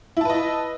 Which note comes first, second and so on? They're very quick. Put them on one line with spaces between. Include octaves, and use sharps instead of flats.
E4 A5 B4 D#5